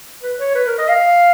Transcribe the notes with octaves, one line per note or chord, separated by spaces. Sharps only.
B4
C#5
B4
A#4
D#5
F5